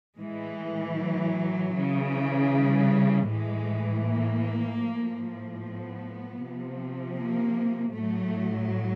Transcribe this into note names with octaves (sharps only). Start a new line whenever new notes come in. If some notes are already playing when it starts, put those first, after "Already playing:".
A2 E3 G#3
F#3
C#3 E3
G3
A2 E3 G#3
A#3
A2 F3
B3
C3 F3
A#3
A2 F#3 A3